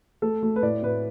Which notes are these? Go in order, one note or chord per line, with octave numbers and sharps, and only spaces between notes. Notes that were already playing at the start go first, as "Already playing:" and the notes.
A3 A4
A3
B4
A2 D5
A2 B4